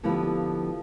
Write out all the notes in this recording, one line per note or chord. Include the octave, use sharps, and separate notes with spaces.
D3 F3 B3 E4 G4 B4